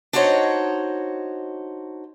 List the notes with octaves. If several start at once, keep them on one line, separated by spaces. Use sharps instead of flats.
D4 D#4 F#4 C5 C#5 D#5